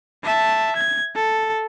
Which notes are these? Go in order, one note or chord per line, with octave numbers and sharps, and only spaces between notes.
E5 A5
G#6
A4